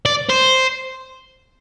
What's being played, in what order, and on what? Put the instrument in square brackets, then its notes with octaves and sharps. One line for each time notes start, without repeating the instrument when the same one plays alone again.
[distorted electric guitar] D5
C5